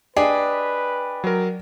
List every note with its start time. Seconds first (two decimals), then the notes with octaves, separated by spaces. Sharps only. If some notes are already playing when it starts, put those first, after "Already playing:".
0.16 D4 G4 G#4 B4 D#5
1.24 F#3 A#4